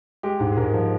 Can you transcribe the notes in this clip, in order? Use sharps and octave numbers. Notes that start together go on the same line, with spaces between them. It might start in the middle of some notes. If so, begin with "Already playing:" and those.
G#3 G4
G#2
G#4
G#2 A#4
F3